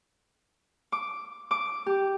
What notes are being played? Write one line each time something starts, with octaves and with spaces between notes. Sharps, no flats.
D6
D6
G4